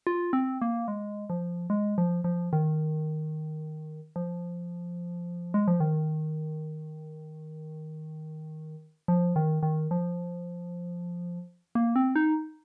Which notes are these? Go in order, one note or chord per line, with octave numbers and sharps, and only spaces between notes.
F4
C4
A#3
G#3
F3
G#3
F3
F3
D#3
F3
G#3
F3
D#3
F3
D#3
D#3
F3
A#3
C4
D#4